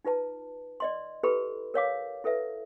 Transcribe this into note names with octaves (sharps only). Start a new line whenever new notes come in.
D#4 F4 B4 A5
D5 D#5 C6
E4 G4 A4 B4 B5 C6
A#4 C#5 F5 D6
E4 A4 B4 E5